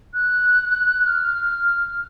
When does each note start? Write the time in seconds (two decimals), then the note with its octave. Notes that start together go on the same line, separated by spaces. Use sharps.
0.14 F#6
1.07 F6